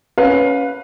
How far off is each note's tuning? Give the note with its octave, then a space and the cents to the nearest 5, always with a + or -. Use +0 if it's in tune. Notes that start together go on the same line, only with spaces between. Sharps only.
C#4 +0 B4 +0 F5 +25